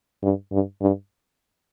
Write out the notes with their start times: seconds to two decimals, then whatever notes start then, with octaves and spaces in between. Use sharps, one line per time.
0.23 G2
0.52 G2
0.81 G2